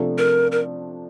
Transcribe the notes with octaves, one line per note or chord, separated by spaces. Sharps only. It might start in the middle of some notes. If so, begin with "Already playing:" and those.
Already playing: C3 F3 A3 D4
A#4
A#4